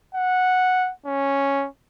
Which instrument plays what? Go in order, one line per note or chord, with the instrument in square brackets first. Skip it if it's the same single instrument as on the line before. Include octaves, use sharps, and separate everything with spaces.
[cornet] F#5
C#4